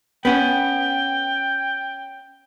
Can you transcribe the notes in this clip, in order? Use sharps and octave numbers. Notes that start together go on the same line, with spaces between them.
B3 C#4 G5